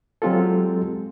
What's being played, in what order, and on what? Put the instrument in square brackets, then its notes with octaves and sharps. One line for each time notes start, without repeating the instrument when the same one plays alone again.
[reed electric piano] F#3 G#3 C4 F4 G4 A4